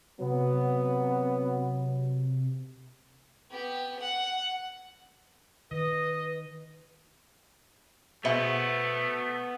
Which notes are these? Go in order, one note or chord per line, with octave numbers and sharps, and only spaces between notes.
C3 F#3 B3
B3 G4
F#5
D#3 B4 D#5
B2 A3 B3 G#4 C5 E5